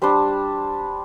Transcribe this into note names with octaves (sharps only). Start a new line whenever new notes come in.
G3 D4 C5